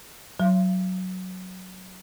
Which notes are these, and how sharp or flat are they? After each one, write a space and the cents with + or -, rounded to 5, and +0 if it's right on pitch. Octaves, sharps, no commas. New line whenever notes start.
F#3 +0 F5 -35